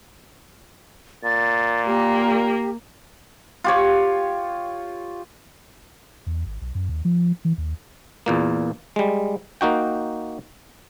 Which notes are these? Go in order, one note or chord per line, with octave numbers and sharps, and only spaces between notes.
A#2 A6
A#3 G4
F4 G4 C#5
E2
G#1
B1
F#2
D#2
F3
E3
D#2
E2 A#2 A#3
G3 G#3
A#3 D#4 F#4 G5